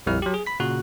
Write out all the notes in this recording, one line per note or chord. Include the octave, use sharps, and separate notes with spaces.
A#1 F2 G3 E4 F6
F#3 G4
G#4
B5 B6
A#2 C#3 F#4 F#6